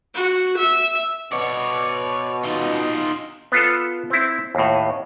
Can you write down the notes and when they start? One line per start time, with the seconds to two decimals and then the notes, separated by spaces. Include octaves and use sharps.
0.15 F#4
0.58 E5
1.32 B2 C#5 D5
2.44 D#4 F4
3.52 B3 F4 A4
4.10 C4 E4
4.55 D#2 A2